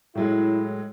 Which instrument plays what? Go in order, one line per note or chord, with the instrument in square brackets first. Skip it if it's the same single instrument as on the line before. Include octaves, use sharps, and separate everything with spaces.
[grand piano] A2 F#3 G#3 [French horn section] E4